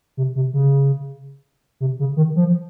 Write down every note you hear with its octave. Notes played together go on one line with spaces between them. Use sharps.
C3
C3
C#3
C3
C#3
D#3
F3